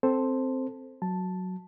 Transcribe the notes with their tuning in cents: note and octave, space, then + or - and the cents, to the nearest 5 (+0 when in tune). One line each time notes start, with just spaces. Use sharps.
C4 +0 A4 +0 C5 +0
F#3 +0 A5 +0